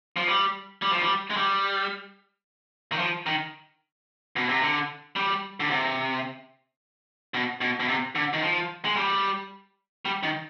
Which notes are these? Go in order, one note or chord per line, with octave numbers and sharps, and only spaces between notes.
F3
G3
G3
F3
G3
G#3
G3
D#3
F3
D#3
B2
C3
D3
G3
D3
C3
B2
B2
B2
C3
D3
D#3
F3
G#3
G3
G3
D#3